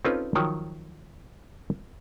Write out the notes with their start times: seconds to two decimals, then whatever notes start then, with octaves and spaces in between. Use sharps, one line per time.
0.05 C4 C#4 D#4 F4 A4 B4
0.35 D#3 F3 F#3 C#5 G5